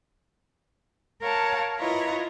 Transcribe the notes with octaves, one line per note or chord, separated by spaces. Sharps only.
A#4 C#5 F5 F#5 A5
E4 F4 B4 C#5 D#5 A#5